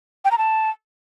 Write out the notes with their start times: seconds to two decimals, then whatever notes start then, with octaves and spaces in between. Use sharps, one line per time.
0.25 G5
0.31 A#5
0.38 A5